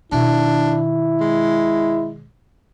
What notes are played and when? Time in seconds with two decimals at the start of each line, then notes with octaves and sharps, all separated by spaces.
0.12 B2 D#3 D4 E4
1.20 G#3